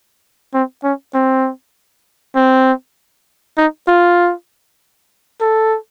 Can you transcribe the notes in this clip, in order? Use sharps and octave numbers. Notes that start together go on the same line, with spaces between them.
C4
C#4
C4
C4
D#4
F4
A4